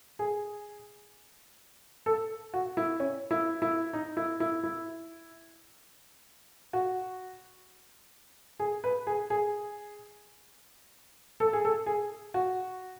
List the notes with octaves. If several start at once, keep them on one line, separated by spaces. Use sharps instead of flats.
G#4
A4
F#4
E4
C#4
E4
E4
D#4
E4
E4
E4
F#4
G#4
B4
G#4
G#4
A4
G#4
A4
G#4
F#4